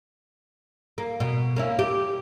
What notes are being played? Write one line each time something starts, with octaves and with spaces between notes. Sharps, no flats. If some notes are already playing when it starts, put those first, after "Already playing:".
A#3
B2
A#3 C#4 E4
G4